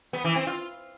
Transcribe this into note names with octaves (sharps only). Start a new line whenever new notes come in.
B3
E3
C4
F4